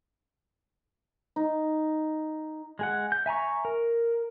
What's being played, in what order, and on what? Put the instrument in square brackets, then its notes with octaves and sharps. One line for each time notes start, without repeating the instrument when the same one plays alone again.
[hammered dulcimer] D#4
[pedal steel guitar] G#3 G#4 F#5
G6
E5 G#5 A#5 C#6
A#4